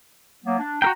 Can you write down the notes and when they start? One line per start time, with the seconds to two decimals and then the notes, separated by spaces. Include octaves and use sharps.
0.45 F#3 A#3 B3
0.59 D4
0.82 F#4 A#4 G5 A#5